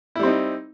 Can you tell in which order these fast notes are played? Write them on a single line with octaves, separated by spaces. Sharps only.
E4 G3 C4 D#4